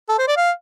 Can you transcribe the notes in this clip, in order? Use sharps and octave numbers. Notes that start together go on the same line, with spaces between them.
A4
C5
D5
F5